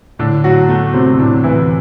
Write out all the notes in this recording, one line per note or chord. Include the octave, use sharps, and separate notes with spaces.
A2 D3 D4
A2 F#3 F#4
F#3 A3
C3 F#3 C4
A2 D3 D4
A2 E3 E4